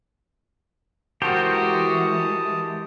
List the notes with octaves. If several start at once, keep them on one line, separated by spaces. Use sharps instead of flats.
E3 G#3 F#4 G4 A#4 C5 A5 D#6